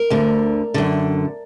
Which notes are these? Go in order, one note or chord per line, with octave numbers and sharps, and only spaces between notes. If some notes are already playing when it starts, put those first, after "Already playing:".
Already playing: A#4
D2 D3
F#2 D3